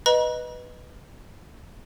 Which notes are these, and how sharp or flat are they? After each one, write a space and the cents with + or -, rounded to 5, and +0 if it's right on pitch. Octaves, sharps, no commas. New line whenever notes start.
B4 +0 D#5 -5 A#5 +45